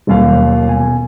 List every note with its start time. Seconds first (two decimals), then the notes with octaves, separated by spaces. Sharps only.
0.07 D#1 D#2 B2 F#3 G3 F5
0.67 B2 B3 G#5